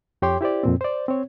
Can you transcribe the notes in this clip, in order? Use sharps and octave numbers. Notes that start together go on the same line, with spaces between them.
F2 G4 C#5 G5 C6 D6
E4 G4 C5 D5
F2 A#2 C4
C5 D5
C4 C#5